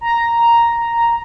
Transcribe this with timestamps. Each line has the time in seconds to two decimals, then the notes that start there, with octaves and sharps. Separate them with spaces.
0.01 A#5